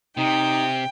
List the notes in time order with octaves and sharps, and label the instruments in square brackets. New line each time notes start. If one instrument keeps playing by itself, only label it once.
[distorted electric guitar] C3 [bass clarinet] D#4 [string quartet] G5